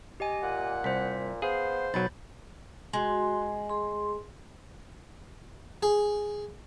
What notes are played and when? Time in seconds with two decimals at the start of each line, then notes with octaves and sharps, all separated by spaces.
0.20 G4 D#5 G#5
0.43 A#2 F#5
0.84 C2 C5 B6
1.42 B3 G#4 C5 F5
1.94 B1 F#3 B5 G6 A6
2.93 G#3 F#4 C6
3.69 G#4 C6
5.83 G#4